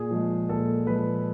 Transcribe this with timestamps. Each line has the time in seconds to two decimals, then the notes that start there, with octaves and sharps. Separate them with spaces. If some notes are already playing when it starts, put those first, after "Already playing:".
Already playing: A#2 G#4
0.11 F3 G#3
0.49 A#2 A4
0.87 F3 G#3 B4